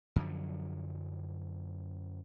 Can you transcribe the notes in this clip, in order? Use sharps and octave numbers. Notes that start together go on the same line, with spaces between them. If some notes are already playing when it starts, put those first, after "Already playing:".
F#2 D3 F3 F#3